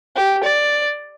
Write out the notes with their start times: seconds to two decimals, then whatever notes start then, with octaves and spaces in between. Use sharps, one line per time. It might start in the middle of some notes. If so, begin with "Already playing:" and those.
0.16 G4
0.44 D5